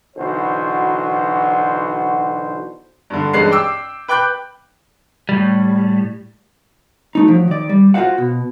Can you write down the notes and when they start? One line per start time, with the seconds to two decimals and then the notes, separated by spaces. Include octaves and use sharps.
0.17 B1 D3 E3 F#4 C5
3.10 G2 D3
3.33 A1 G2 G#3 F#6 C7
3.51 G5 D6 E6
4.08 B4 G5 D6 F#6 G6
5.29 A2 G3
7.15 F#3 A3 D#4
7.28 F3 F#3
7.48 D#3 D5
7.69 G3
7.94 F4 F#4 B4 C5 F5 F#5
8.18 B2